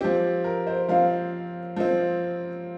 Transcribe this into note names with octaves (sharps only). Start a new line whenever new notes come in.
F3 C4 G4
A#4
C5
F3 C4 F5
F3 C4